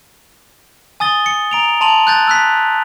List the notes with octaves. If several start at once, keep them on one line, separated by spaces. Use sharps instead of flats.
G#5 D#6 A6 G7
C#7
A#5 D7 F7
A5 C6 D#7 F7 F#7
F#6 G6 A6
E6 F#6 B6